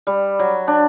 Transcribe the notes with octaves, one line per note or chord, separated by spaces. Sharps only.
G3
F#3
D4